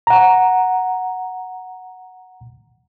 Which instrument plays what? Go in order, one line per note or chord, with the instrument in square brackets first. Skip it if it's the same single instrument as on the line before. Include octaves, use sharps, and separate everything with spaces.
[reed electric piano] F#5 A#5